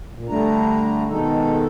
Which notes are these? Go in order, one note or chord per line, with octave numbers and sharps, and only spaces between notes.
A#2
D3 G3 A3 D4 A#5
B2 D#3 G#3 D#4 A4